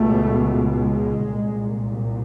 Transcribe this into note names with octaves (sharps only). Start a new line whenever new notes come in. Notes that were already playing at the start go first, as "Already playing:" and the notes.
Already playing: C#2 B2 A3
G#3
C2 A#2